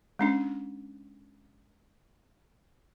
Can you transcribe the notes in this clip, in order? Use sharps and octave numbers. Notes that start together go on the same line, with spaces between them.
G#3 C#4 D4